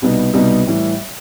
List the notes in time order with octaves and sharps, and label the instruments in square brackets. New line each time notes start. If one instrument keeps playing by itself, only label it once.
[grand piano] C2 B2 G3 B3 D#4
C2 B2 G3 B3 D#4
A2 E3 G3